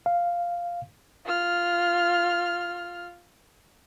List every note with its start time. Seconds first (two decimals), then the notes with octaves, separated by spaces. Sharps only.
0.06 F5
1.25 F4 F6